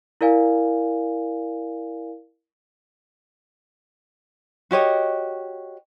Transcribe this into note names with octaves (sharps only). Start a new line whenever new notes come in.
E4 A#4 D5 F5 G#5
F#4 G4 C#5 D#5